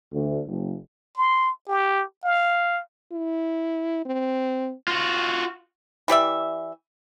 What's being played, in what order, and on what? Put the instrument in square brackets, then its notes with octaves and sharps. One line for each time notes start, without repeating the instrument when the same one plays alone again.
[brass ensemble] D2
F#1
[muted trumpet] C6
G4
F5
[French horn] E4
C4
[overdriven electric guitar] F4 F#4
[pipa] E3 G4 D5 E5